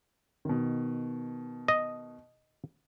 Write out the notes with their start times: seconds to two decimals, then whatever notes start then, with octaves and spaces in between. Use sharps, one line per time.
0.45 B2 D#3
1.68 D#5